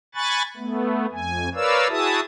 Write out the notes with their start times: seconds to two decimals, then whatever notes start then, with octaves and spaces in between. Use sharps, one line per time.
0.15 G#5 B5 C#6 F#6 A6
0.57 A3 B3
1.12 F2 G#5
1.55 A#4 B4 C#5 D5 F5 E6
1.89 E4 F#4 G#4 E5 A5 D#6